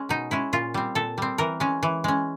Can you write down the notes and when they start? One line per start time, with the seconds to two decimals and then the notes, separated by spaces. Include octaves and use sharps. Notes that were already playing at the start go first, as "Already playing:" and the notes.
Already playing: G#3 C#4
0.09 B2 D#4
0.31 G#3 C#4 E4
0.53 A#2 F4
0.74 G3 C4
0.95 A#2 A4
1.18 G3 C4
1.38 E3 A#4
1.60 G#3 C#4
1.83 E3
2.04 G#3 C#4